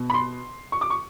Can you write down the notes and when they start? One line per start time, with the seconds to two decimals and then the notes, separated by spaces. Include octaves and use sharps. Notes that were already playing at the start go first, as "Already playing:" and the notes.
Already playing: B2 B3
0.10 B5
0.14 C6
0.72 C#6
0.81 D6
0.90 C#6